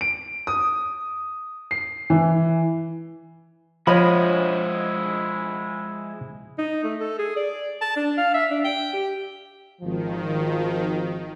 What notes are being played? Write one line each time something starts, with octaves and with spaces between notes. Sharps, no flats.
D7
D#6
C7
E3
F3 G#3 E4 C#5 D#5 B5
D#4
A3
A4
G#4
D5
A5
D4
F5
E5
D4
G5
G4
G#1 D#3 F3